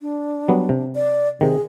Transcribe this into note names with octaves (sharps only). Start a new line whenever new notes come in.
D4
F#3 G3 B3
C3
D5
C3 D#3 G#4